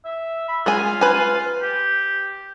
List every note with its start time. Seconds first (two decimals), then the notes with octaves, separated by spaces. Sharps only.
0.05 E5
0.48 B5
0.66 G#3 F4 G#4 G#5
1.01 B4 G#5
1.62 G4